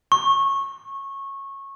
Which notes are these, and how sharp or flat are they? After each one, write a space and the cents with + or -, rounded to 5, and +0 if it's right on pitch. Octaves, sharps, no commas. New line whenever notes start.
C#6 -20